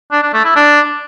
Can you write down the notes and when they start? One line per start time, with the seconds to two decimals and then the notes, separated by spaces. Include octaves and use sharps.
0.12 D4
0.23 D4
0.34 A3
0.45 E4
0.56 D4